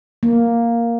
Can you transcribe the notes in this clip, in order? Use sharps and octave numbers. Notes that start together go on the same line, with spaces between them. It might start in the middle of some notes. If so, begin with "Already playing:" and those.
A#3